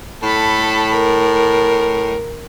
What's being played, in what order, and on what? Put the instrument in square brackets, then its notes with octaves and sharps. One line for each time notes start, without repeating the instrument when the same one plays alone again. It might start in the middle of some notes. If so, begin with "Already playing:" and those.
[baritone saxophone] A2 [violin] A4 B5
[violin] A#4